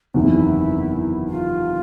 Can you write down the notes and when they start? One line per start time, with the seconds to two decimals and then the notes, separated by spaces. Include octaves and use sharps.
0.14 F#1 E2 C3 D#3 E4
1.28 F4